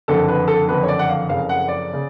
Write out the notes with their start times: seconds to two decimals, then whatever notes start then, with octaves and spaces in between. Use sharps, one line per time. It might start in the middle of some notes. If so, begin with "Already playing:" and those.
0.08 F#1 F2 D3 A4
0.28 B4
0.48 A4
0.68 F#1 F2 D3 B4
0.83 C#5
0.88 D5
0.99 F#5
1.09 F5
1.29 F#1 F2 C#3 F5
1.49 F#5
1.68 D5
1.93 C#3